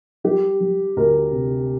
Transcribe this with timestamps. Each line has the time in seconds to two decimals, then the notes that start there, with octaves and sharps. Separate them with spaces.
0.24 G3 G4
0.60 G3
0.97 D2 A#4
1.32 C3